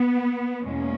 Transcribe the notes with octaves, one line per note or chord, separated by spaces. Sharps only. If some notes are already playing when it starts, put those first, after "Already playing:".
Already playing: B3
E2 B2 G#3 A#3 C#4